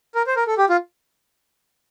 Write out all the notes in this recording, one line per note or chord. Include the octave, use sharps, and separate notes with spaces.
A#4
C5
A#4
A4
G4
F4